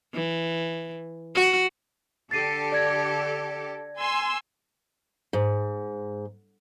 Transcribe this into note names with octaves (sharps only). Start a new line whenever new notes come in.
E3
F#4
D3 G4 A4 A6 C7 D#7
D5 G#6 A#6
G#5 C6 E6
G#2